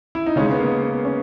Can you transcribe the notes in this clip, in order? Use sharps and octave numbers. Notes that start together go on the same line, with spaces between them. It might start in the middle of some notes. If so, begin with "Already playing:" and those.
E4
D#4
C#3 G#3 C#4
B3
A#3
B3
C#4